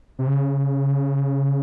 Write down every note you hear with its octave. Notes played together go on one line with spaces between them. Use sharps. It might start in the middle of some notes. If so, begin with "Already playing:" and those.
C3
C#3